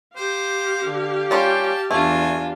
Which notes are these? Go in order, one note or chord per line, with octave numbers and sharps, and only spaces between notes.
G4 C5 F5
D3
G3 C#4 F4 G5 A5
E2 A3 D4 F4 G#5